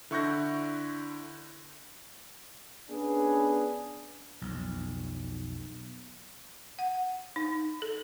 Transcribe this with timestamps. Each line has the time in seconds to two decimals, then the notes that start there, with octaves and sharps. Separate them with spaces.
0.11 D3 E4 C#6 F#6 G6 A#6
2.90 B3 C#4 D4 G#4 B4
4.41 B1 F2
6.79 F#5
7.36 D#4
7.82 A4